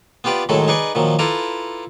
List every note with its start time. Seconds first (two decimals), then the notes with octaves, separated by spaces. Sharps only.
0.24 B3 F4 G4 B4 D5
0.49 A2 D#3 F#3 G#3 A4
0.68 D#4 G#4 B4 D5 C#6
0.95 A#2 D#3 F3 F#3
1.19 E4 F4 A4 B4 A#5 D6